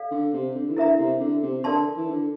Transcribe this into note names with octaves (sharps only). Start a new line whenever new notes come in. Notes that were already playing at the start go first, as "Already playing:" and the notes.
Already playing: A4 D5 F5
D3
C3
D3
E3
D3 E4 A#4 E5 A#5
C3
D3
C3
D3 A#4 D5 A5 C6
E3
D3